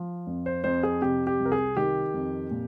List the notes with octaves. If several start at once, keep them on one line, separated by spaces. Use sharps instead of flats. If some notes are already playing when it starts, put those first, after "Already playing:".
Already playing: F3
F2
C5
F2 C5
G#4
C3 G4
G4
C2
A#4
G#4
D#3 G4
F2
A#2